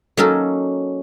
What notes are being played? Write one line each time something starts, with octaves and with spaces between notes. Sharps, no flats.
F#3 A#3 C#4 D#4 F#4 A4